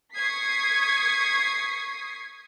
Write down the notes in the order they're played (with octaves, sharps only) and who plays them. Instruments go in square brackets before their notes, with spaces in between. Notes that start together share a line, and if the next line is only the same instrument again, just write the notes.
[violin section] C#6 D#6 G#6 B6 C7